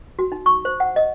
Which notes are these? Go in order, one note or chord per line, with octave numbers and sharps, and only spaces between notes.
F#4
D#4
C#6
C5
F#5
D#5